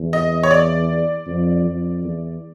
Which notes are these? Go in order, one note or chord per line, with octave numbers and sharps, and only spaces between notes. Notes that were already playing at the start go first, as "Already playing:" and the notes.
Already playing: E2
D#5
C#5
D5
F2
F2
E2